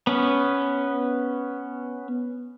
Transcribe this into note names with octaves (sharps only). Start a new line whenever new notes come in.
B3 C#4